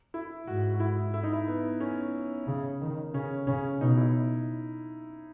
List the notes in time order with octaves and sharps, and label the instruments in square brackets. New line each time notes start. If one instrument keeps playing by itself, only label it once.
[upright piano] E4
[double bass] G#2 [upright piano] F#4
[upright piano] F#4
E4
E4
D#4
E4
B3
C#4
[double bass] C#3
D#3
[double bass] C#3 [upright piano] C#4
[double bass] C#3 [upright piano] C#4
[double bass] B2 [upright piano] D#4
[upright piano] E4